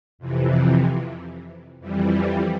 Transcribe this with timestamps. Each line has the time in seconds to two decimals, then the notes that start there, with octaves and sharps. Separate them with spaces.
0.19 F2 C3 E3
1.80 F2 E3 G3